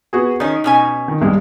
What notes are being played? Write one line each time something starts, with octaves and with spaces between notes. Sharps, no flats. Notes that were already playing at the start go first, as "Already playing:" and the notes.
B3 F#4 G#4
D#3 C#4 D#4
B2 C#4 G#5
D#3
C2 G2 G#3